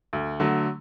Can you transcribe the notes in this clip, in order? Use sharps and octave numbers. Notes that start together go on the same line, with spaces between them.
D2
D3 F#3 A3